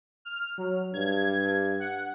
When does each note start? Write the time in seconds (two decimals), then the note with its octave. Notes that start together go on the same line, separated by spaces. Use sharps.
0.25 F6
0.58 F#3
0.94 G2 G#6
1.79 F#5